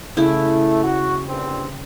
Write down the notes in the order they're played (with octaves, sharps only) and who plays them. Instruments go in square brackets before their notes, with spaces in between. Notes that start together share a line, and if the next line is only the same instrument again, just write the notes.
[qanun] C#3 E4 [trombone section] A3
[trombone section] F#4
A#1 G2 C4